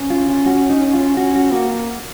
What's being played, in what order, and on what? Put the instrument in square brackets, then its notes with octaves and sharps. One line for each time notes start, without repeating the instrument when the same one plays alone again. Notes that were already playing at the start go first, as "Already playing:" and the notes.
Already playing: [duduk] C#4
[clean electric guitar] F4
F4
F#4
D#4
F4
[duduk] C#4 [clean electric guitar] F#4
[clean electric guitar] F#4
[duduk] A#3 [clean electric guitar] F#4